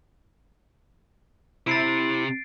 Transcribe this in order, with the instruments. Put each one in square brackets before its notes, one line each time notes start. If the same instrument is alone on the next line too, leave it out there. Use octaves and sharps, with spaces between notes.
[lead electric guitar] C3 [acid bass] E4 [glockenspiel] A6 C7 D7